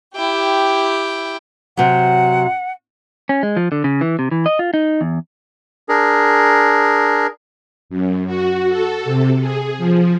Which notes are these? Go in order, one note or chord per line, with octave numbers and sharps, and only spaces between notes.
E4 G4 G5
C3 F#3 F#5
C#4
G#3
F3
D3
C#3
E3
C3
E3
D#5
F4
D#4
E2
D4 G#4 A#4
F#2
F#4
A4
C3
G#4
F3